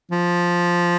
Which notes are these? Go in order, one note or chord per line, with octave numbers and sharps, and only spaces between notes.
F3